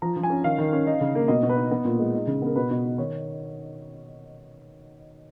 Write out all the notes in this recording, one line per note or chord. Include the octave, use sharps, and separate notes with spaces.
F3 A#5
F3
G#5
C#4
D#3 F5
D#3
C#4
D#4
C#3
A#3
B2 D#5
B2
B4
D#4
B3
A#2
G#3
D#4
C#3
B3 A#4
B2 B4
B2
D#4
D#3 C#5